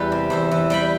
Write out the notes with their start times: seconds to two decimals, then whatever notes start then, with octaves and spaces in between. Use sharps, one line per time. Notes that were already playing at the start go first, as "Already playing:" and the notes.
Already playing: E2 E3 G3 G4 B4
0.12 C3
0.30 E2 C5 E5
0.51 E3
0.70 G3 G5 B5